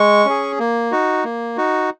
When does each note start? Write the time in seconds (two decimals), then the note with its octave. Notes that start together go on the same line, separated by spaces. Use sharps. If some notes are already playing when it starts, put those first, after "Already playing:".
Already playing: G#3 C#6
0.25 C#4 G#4
0.59 A#3
0.92 D#4 F#4
1.24 A#3
1.57 D#4 F#4